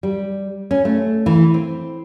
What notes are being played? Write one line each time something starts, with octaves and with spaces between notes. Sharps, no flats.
G3
C#4
A3
E3
C4